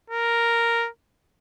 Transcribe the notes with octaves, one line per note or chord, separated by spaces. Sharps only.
A#4